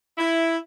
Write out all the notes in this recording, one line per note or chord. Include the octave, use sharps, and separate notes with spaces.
E4